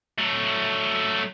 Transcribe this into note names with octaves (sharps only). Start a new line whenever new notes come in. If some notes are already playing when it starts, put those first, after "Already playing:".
F#3 A3